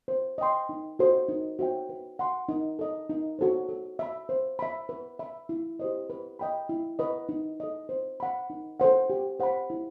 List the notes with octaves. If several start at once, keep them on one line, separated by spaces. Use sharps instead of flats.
C5
D#5 G5 C6
D#4
F#4 A4 C5 D#5
D#4
F#4 C5 E5 G5
B4
F#5 C6
D#4
A4 D#5
D#4
F#4 A4 C5
A4
E5 B5
C5
E5 B5
B4
E5 B5
E4
G4 C5 D#5
B4
D#5 G5 B5
E4
B4 D#5
D#4
A4 D#5
C5
F#5 B5
D#4
A4 C5 F#5
G4
C5 F#5 B5
E4